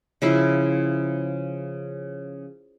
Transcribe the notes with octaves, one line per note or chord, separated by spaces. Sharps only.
C#3 F3 E4